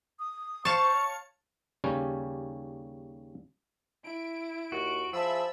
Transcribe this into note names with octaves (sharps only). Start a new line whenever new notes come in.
D#6
C5 F5 A5 C#6
C#5
D#2 C#3 G3 C#4
E4 D7
D#2 F#4
F3 G#4 E5 A5 B5 E6